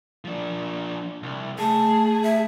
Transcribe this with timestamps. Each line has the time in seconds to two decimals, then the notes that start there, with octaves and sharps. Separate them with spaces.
0.25 F3 D4
1.23 C2
1.58 A3 G#4 A5
2.23 E5